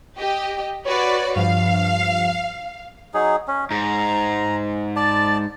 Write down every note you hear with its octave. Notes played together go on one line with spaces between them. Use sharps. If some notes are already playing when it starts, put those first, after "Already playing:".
G4 D#5
F#4 B4 C#5 D5
G2 F3 F5
F#3 D#4 G#4
C#4
G#2 A#5
D5 A5